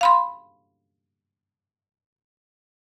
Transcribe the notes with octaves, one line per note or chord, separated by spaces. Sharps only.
F5 B5 C6